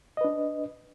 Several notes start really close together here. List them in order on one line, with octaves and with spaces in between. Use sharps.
D#5 B4 D4